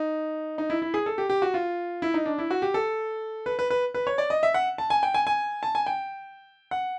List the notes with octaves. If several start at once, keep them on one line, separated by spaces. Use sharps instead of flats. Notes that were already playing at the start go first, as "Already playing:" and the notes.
Already playing: D#4
D#4
E4
E4
G#4
A4
G4
G4
F#4
F4
E4
D#4
D4
E4
F#4
G4
A4
B4
B4
B4
B4
C#5
D5
D#5
E5
F#5
A5
G#5
G5
G#5
G#5
A5
G#5
G5
F#5